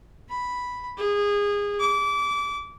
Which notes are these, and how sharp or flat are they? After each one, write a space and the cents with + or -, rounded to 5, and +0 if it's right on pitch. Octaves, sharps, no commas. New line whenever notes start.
B5 +0
G#4 -25
D6 -25